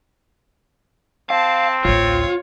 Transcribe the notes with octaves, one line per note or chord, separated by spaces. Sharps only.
C4 F5 A5
A1 D2 F4 C#5